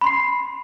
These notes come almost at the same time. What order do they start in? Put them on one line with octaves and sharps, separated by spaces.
B5 C6 C7